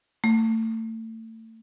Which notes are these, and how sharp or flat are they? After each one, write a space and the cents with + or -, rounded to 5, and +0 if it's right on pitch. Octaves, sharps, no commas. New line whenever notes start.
A3 +30